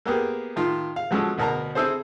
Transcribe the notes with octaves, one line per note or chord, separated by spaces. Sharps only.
A#3 B3 G4 G#4 A#4
A2 D#3 F4
F5
F3 F#3 G#3 C#4 A4
D2 B2 A#4 A5 A#5
C4 E4 G#4 A4 C5